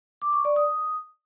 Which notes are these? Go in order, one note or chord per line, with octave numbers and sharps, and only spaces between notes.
D6
C#6
D5
D#6